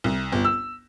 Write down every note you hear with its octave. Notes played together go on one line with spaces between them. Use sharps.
C2
G1
E6